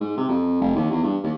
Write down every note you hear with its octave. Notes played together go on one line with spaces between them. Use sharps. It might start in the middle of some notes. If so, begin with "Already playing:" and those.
G#2
C3
F2
F1
D#2
E2
G2
D#2